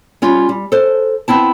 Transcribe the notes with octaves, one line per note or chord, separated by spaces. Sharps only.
G3 C#4 F4
G3
A4 C5
B3 C4 E4 A5